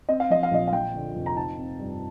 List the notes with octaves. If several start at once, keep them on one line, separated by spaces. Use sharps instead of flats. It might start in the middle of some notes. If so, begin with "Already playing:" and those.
C4 D#5
F5
F3 D#5
F5
A#1 D#5
F5
F3 G5
D3
F1
A#5
D#4 A5
C4
G2